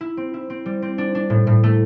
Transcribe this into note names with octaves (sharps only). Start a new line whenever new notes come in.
E4
C4
E4
C4
G3
C4
D4
D4
A2
A2
A3